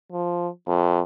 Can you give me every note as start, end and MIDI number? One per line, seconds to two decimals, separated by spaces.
0.12 0.48 53
0.68 1.00 41